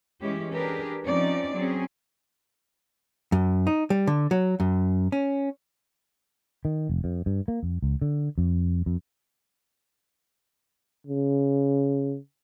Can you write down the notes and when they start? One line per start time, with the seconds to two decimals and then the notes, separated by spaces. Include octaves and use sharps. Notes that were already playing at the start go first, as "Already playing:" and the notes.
0.21 E3 G#3 C#4 E4 G4
0.52 D4 G4 G#4 A#4 B4
1.05 F3 C4 C#4 D#4 D5
1.54 F#3 C4 C#4 G#4
3.32 F#2
3.67 D#4
3.90 G3
4.07 D3
4.31 F#3
4.60 F#2
5.12 C#4
6.65 D#3
6.89 F1
7.04 F2
7.26 G2
7.48 A#3
7.63 F2
7.82 C#2
8.02 D3
8.38 F2
8.86 F2
11.07 C#3